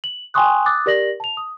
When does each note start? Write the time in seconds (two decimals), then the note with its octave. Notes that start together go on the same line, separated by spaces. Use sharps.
0.04 F#7
0.34 G5 G#5 C6 C#6 D#6 F#6
0.66 D6 D#6 F#6 A6
0.86 G4 A#4 D5 A#6 F#7
1.20 A5 F7
1.37 D#6